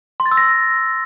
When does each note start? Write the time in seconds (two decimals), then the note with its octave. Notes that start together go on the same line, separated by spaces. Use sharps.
0.20 C6
0.26 A6
0.31 E6
0.37 A#6